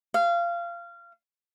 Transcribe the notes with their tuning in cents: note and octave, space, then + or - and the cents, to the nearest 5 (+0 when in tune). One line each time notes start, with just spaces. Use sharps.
F5 -20